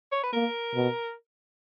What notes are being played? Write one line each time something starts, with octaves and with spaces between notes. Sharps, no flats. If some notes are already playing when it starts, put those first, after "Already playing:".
C#5
B4
A#3 A#4
B2